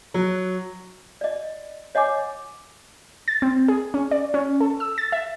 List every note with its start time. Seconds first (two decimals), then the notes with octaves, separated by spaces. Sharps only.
0.14 F#3
1.21 D5 D#5
1.95 C#5 D#5 F#5 G#5 D6
3.28 A6
3.42 C4
3.68 G#4
3.94 C#4
4.11 D5
4.34 C#4
4.60 A4
4.80 E6
4.98 A6
5.12 E5